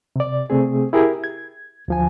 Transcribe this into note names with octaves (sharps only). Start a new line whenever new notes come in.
C3 D5
C3 A3 C4 G#4
E4 G4 G#4 A#4
G#6
D2 F3 G#5